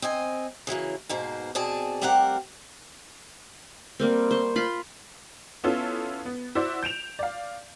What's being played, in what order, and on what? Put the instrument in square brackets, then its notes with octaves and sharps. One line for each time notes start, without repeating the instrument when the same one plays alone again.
[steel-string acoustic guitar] C4 D#5 G#5
C#3 E3 F#3 A#3
G#2 B2 A#3 C5
B2 C4 G#4 D5 A5
G3 A3 C4 G4 A#4 F#5
[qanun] G3 A#3 C4
C5 C#6
F4 B5 C6
[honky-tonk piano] B3 C#4 E4 F4 A4
B3
E4 F#4 C5 D5
G6 D7 E7 F7
D5 F5